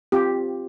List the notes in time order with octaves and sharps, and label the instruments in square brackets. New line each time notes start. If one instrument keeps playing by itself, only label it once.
[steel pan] C4 F4 G4